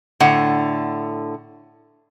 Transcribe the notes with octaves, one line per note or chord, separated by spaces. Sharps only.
A2 D3 F#5